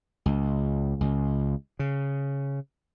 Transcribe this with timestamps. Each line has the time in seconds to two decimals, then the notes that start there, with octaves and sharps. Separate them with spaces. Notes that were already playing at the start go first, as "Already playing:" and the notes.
0.26 C#2
1.01 C#2
1.79 C#3